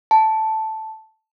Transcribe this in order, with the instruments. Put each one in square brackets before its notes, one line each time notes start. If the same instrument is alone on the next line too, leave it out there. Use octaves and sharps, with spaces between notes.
[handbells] A5